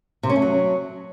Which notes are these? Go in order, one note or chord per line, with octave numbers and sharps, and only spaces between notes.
C3
C#4
A3
F#3